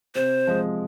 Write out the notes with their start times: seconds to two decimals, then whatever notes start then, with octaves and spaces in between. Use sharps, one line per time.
0.15 C3 C5
0.47 F3 G#3